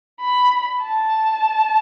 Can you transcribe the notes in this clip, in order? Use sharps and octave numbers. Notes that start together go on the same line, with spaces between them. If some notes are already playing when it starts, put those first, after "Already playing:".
B5
A5